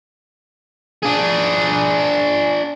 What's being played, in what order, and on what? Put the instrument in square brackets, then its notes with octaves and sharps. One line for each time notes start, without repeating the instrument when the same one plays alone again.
[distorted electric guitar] D4 G#4